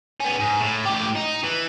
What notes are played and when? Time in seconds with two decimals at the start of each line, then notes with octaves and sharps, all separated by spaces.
0.20 B3 C#4
0.40 G#2
0.59 A2
0.85 A2 G4
1.15 D#4
1.44 E3